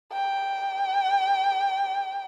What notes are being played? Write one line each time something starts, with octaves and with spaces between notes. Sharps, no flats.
G5